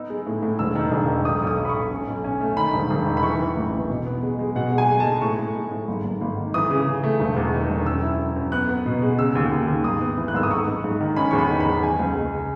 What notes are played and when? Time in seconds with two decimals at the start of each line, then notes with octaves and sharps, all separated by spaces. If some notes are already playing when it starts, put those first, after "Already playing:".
Already playing: B3 D#4 E6
0.10 G#3
0.26 A2
0.42 A2
0.59 E1 E6
0.75 D#3
0.92 E1
1.08 D#3
1.25 B1 D#6
1.42 B1
1.47 D#6
1.58 B1
1.65 B5
1.69 C#6
1.75 B1
1.91 C#4
2.08 B1
2.24 C#4
2.41 A3
2.57 D#3 B5
2.74 E1
2.90 E1
3.06 D#3
3.17 B5
3.23 E3 C#6
3.40 E3
3.57 A1
3.73 E3
3.90 B2
4.06 B3
4.23 G#3
4.39 G#3
4.55 B2 F#5
4.72 G#3
4.78 G#5
4.88 G#3
5.00 A5
5.06 G#3
5.21 A2 C#6
5.39 A2
5.55 G#3
5.71 A2
5.88 G#1
6.04 G#1
6.21 G#1
6.38 D#3
6.54 E3 D#6
6.70 C#3
6.88 C#3
7.04 A3
7.20 E1
7.37 E2
7.53 D#3
7.70 E1
7.86 F#2 E6
8.03 E4
8.19 F#2
8.36 F#2
8.52 B3 F#6
8.69 B3
8.86 B2
9.02 G#3
9.18 C#3 E6
9.35 D#2
9.52 D#2
9.68 D#2
9.84 G#1 D#6
10.01 B3
10.18 E3
10.28 F#6
10.34 G#1 E6
10.43 D#6
10.50 G#2 C#6
10.67 G#2
10.84 G#2
11.01 D#3
11.16 C#4 B5
11.31 E2 C#6
11.38 B5
11.50 D#3
11.60 B5
11.66 E2
11.83 G#3 G#5
11.99 C#2
12.15 G#3
12.32 C#3